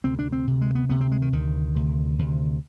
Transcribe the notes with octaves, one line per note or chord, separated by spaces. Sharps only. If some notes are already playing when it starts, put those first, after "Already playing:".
D2 C3 C4
D4
C4
D2 C3
G#3
B3
D2 C3 B3
C4
G#3
D#3
D2 C3 D#3
D2 C3
D2 C3